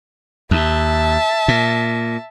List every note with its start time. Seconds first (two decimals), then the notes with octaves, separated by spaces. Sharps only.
0.51 D#2 E5 A5
1.48 A#2